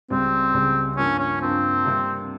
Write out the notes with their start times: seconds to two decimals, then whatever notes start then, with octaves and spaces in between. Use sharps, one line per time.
0.10 C#2 C#3 G3 C4
0.54 C#2 C#3 G3
0.97 G2 F3 A#3 C#4
1.19 C#4
1.41 G2 F3 A#3 C4
1.84 C3 G3 A#3